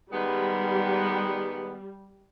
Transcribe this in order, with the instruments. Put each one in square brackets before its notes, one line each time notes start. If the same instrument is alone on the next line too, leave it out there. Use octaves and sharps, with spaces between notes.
[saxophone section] D#3 G#3 B3 [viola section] G3